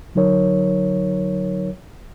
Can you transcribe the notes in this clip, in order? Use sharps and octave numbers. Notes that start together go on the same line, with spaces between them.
D3 F#3 D#4 A#4 C#5